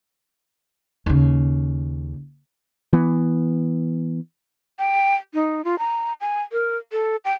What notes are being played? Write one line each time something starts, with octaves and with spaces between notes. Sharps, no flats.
D#2 C#3
E3 B3
G5
D#4
F4
A#5
G#5
A#4
A4
G5